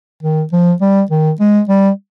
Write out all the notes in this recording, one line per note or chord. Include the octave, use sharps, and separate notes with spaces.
D#3
F3
G3
D#3
G#3
G3